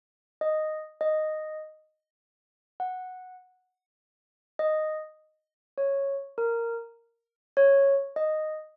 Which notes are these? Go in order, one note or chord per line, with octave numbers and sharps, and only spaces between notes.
D#5
D#5
F#5
D#5
C#5
A#4
C#5
D#5